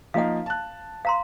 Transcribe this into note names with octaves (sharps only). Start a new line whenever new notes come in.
F3 A#3 D#4 F5 F#5
A5 F#6
F5 A#5 C6